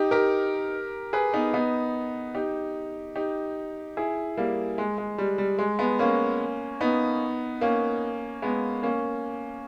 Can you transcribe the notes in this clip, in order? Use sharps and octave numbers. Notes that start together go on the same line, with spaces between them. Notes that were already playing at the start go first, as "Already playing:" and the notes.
Already playing: D#4 G4
G4 A#4
G#4 B4
B3 D#4
B3 D#4
D#4 G4
D#4 G4
E4 G#4
G3 A#3
G#3
G#3
G3
G3
G#3
G#3 B3
A#3 C#4
B3 D#4
A#3 C#4
G#3 B3
A#3 C#4